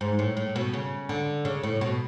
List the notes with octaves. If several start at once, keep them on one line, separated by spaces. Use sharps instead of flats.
G#2
A2
A2
B2
C#3
D3
C#3
A2
B2